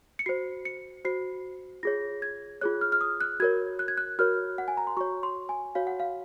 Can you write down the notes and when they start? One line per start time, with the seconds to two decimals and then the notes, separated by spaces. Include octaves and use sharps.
0.19 C#7
0.26 F#4 C5 C7
0.65 C#7
1.05 F#4 C5 C7
1.83 F4 G#4 C#5 A#6
2.22 G#6
2.61 F4 G#4 C#5 F#6
2.81 F6
2.92 F6
3.01 D#6
3.21 F#6
3.40 F#4 A#4 C#5 G#6
3.79 F#6
3.88 G#6
3.97 F#6
4.19 F#4 A#4 C#5 F6
4.58 F#5
4.68 G#5
4.77 A#5
4.87 C6
4.97 F#4 C#6
5.01 C#5
5.23 C6
5.49 G#5
5.75 F#4 C#5 F5
5.87 F#5
6.00 F5